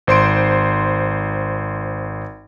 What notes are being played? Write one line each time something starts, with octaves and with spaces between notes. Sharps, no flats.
G#1 C5 C6 D7